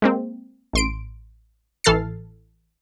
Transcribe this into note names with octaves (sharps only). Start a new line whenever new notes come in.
G#3 A#3 C4
A1 C6 D7
A1 E3 A4 F6 A6 C7